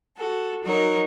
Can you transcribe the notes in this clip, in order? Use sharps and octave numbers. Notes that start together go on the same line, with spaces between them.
F#4 A4
F#3 D#4 F#4 A#4 C#5